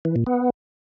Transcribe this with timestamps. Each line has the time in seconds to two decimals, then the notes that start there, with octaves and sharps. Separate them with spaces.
0.05 E3
0.16 A#2
0.27 B3